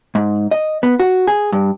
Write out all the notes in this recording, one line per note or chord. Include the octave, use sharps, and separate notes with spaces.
G#2
D#5
B3
F#4
G#4
G2